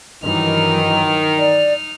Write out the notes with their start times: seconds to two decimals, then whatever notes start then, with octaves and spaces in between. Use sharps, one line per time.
0.23 G2 D#3 E3 F#3 D#4 F6
1.39 D5